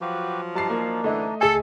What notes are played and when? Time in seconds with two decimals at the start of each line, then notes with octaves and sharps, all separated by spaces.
0.01 F3 F#3 F#4 G4 B4
0.55 G3 D4 D#4 A5 C7
0.70 A#3
1.04 F#2 D3 E3 A3 D#5
1.41 C#2 G#4 A4 G#5